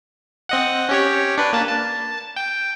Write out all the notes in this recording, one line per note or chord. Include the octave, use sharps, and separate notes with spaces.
C4 D#5 F#5
C#4 G4 C#5
D4 B4
A#3 A5
A5
G5